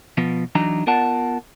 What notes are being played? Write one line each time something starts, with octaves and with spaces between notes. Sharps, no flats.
B2 F3 B3
E3 F#3 D4 D#4 A#5
B3 F4 A#4 D5 F#5 A5